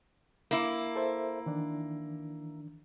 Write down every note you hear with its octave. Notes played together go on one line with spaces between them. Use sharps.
A#3 E4
A4 C5 E5
D#3 E3 D4